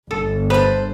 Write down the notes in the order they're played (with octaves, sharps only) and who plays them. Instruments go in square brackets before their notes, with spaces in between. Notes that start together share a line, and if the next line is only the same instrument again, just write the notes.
[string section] G1 [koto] A4
[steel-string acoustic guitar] A4 C5 [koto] B4